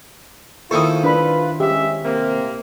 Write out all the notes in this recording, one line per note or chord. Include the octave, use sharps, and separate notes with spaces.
D#3 A#3 E4 F4 A4 C5 C#6 D#6
D4 B4 B5
G#3 C#4 G4 E5
C3 A#3 C4